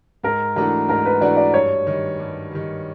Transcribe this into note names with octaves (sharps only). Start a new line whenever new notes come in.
G#2 A#4
E3 A3 D4 F#4 A#4
G#2 A#4
B4
E3 A3 D4 F#4 D5
D5
G2 C#5
D#3 G3
G2
D#3 G3